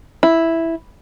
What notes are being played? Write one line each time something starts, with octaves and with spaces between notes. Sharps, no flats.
E4